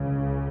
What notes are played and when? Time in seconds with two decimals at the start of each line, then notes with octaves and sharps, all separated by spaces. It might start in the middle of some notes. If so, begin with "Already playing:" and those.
Already playing: C#2 C#3